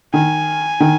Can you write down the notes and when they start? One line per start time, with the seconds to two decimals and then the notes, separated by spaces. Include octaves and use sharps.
0.14 D#3 G#5
0.80 D#3